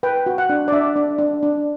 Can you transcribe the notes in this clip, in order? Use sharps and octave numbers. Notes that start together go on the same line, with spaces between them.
B4 G5
F#4
F#5
D4
D5
D4 E5
D4
D4
D4